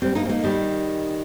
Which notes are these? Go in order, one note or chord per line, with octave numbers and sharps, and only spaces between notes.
G3 C4
A#3 D#4
C4
A#3 D#4
D#3 G3